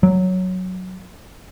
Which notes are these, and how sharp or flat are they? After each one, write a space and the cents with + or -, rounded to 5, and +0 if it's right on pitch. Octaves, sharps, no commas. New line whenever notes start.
F#3 +0